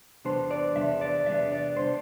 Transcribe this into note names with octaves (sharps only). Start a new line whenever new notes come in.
E2 C3 G3 B3 D4 C5
D5
E2 C3 G3 B3 D4 E5
D5
E2 C3 G3 B3 D4 E5
D5
C3 G3 B3 D4 C5